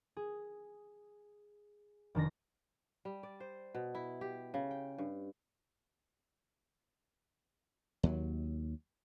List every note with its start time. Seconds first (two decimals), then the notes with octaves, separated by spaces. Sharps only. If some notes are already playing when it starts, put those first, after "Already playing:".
0.17 G#4
2.15 F1 D#3 D4 A#6
3.05 G3
3.23 D5
3.40 C5
3.75 B2
3.95 E4
4.21 G4
4.54 C#3
4.71 G5
4.98 G2
8.03 D#2 F#3